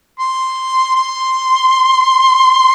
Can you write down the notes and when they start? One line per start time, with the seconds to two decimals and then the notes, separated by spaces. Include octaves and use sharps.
0.19 C6
0.95 C6